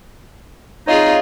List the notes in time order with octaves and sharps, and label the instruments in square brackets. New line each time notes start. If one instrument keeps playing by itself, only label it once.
[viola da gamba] C4 F4 G#4 [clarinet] D#4 [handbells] C#5 D#5 F5